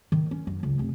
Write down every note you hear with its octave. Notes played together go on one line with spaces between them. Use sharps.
D#3
C#4
F#2
C#2
F1